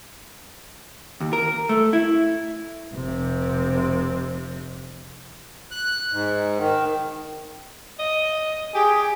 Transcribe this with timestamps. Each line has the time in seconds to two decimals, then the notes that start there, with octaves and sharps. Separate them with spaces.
1.20 D#2
1.33 A#4
1.69 A3
1.93 E4
2.95 F1 C3
5.71 F#6
6.13 G#2
6.58 D#3
7.99 D#5
8.75 G4 G#4